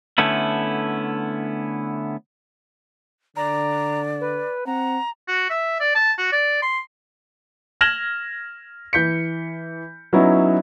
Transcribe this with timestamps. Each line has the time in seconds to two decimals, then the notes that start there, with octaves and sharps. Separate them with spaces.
0.18 D3 A3 B3 C#4 E4
3.36 D3 D5 A#5
4.21 B4
4.67 C4 F#5 A#5
5.28 F#4
5.50 E5
5.80 D5
5.95 A5
6.18 F#4
6.32 D5
6.62 C6
7.81 F6 G#6 A#6 E7 F#7 G7
8.93 E3 G6 B6 C#7
10.13 F#3 B3 C#4 D#4 E4